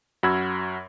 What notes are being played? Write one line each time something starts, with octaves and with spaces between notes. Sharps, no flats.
F#2 F#4 B5 E6 G#6